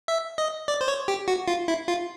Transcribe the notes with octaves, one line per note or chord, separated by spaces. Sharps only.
E5
D#5
D5
C5
C#5
G4
F#4
F4
E4
F4